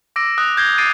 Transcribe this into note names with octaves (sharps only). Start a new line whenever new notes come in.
D6 E6 A#6 D7
D#6 F#6
G6 G#6 A#6 C7 G7
D6 A6 C7 D7 D#7